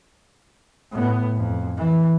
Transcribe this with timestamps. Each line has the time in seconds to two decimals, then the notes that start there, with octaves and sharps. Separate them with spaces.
0.91 A2 B3
1.37 F2
1.77 E3